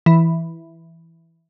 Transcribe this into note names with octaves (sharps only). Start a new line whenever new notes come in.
E3